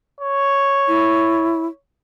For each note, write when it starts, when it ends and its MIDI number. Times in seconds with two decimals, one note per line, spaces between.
0.20 1.77 73
0.88 1.66 64